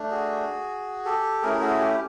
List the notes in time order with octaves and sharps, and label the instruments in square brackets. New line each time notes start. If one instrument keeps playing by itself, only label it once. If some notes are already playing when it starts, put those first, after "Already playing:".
Already playing: [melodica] A3 D4
F#4 G#4
G4 A4
A3 C#4 E4 G#4 A#4
F#4 G#4
G4